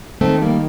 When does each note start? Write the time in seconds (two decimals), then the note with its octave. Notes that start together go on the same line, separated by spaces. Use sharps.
0.21 D#3 A3 C4
0.42 G3 A#3